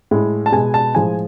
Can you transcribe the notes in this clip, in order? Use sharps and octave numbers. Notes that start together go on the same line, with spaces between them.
A2 G#3
A5
B2 G#3 G#5
A5
A2 F3 G#3 G#5